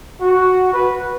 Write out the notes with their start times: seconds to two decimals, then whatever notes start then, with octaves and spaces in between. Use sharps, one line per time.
0.21 F#4
0.73 B4